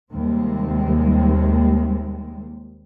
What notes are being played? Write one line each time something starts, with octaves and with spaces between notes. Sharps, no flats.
D#2 C3 G3 G#3